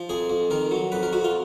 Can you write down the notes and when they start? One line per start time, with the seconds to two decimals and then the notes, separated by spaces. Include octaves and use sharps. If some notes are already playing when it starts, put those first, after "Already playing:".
Already playing: F3
0.09 F2 G#4
0.30 F2
0.51 D#3 A#4
0.71 F#3
0.92 F2 B4
1.03 A#4
1.13 F2 F#4
1.24 F4